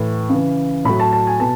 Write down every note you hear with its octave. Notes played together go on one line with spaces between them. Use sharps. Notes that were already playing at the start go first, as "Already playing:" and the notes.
Already playing: A2 E3
C#3 E3
A2 F#3 B5
A5
A5
G#5
B2 A5